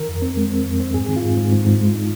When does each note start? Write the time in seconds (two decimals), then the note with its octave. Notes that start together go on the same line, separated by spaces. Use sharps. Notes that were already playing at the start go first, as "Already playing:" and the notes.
Already playing: D#3 A#4
0.08 F2
0.22 C4
0.37 G#3
0.50 C4
0.66 F2
0.80 C4
0.94 G#2 G#4
1.06 D#3 G#4
1.16 F4
1.23 G#2
1.37 G#2
1.52 G#2
1.67 G#2
1.81 G#3
1.95 D#4